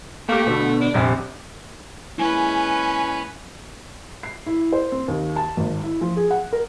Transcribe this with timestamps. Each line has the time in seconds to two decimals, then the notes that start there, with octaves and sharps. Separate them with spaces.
0.29 A3 A#3 G4
0.46 B2 D3
0.81 D4
0.94 D#1 A#1 C3
2.18 G#3 A#3 C#4 E4 B4 G#5
4.23 C7
4.46 E4
4.73 C5
4.92 C4
5.08 D#2
5.36 A5
5.57 G#1
5.83 E4
6.01 F3
6.16 G#4
6.31 F#5
6.53 A#4